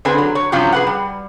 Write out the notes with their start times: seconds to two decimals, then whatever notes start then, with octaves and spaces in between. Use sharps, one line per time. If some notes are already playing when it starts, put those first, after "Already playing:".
0.05 D3 C4 G#4 B4 G#5
0.18 F#3
0.35 C#5
0.52 G2 C3 F3 F#3 C#4 F4
0.72 G#4 B4 F#5
0.87 G3